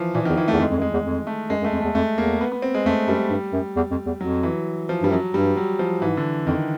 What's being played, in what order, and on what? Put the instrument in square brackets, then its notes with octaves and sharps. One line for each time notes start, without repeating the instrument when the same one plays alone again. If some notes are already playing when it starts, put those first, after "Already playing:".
Already playing: [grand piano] E3 F3
[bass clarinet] A#2 [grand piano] E3
[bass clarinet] E2 [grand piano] D#3
[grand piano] E3
A3
[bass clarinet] E2
[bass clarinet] F2 [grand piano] G#3
[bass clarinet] F2
F#2
[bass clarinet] F2 [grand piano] G#3
[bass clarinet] E2
F2
[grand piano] A3
[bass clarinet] F#2 [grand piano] G#3
[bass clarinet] F#2
[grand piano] A3
[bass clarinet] F2
[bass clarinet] E2 [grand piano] A3
[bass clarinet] F2 [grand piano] A3
[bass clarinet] E2 [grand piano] A#3
[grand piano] B3
B3
C4
G#3
[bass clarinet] F2 [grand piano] A3
[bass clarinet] F#2 [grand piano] G3
[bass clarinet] G2
F#2
E2
F2
E2
[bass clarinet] F2 [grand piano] F#3
[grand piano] E3
F3
[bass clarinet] G2 [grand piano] G3
[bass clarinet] F#2 [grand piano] F#3
[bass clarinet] G2 [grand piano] G3
[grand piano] F#3
F3
[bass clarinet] G#2 [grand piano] E3
[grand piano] D3
[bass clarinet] F2 [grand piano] D#3